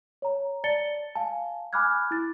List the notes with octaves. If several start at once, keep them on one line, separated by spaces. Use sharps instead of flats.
C#5 A#5
D5 A5 A6 C#7 G7
F5 G#5 A5
G#5 B5 D6 F6 F#6 G#6
E4 A6